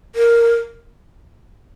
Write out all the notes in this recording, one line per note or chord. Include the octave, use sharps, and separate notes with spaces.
A#4